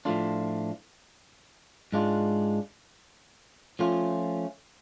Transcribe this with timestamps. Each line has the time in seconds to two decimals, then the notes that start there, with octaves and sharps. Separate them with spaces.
0.05 A2 F3 A3 D4 F4
1.92 G#2 G#3 D4 F4
3.79 F3 A3 C#4 F4